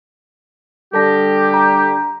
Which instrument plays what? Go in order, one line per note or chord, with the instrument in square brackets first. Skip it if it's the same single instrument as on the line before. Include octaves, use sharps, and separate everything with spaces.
[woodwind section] D3 G3 G4 [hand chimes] A4 A5 A#6
[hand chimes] A#5